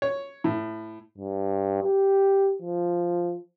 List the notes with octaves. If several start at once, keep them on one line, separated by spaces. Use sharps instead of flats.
C#5
A2
G2
G4
F3